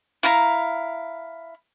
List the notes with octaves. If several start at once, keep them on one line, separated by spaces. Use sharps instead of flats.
E4 F5 A#5